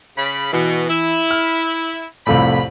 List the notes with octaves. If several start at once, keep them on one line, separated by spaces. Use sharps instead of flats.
C#3 B5
B2 E3
E4
F6
C2 F2 A2 B5